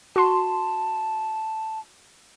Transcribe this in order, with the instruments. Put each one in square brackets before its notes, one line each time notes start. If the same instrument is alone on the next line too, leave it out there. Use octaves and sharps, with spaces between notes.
[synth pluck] F#4 C6 [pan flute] A5